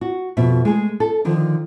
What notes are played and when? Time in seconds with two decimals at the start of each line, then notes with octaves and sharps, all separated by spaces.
0.01 F#4
0.37 F2 B2 F4 E5
0.65 G#3 A3 G#4
1.00 A4
1.25 D3 D#3 F3